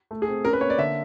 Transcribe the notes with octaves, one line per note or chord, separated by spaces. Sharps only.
A3
G#4
C4
C#4 A#4
B4
A#3 C#5
D5
D3 E5